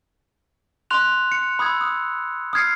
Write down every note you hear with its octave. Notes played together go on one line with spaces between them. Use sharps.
C6 F#6 F7
C#7
B5 D#6 E6 G#6
D#6
D#6 F6 G#6 C7 C#7